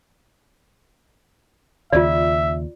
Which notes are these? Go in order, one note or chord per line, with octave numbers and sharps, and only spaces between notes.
D#2 C#3 F4 D5 E5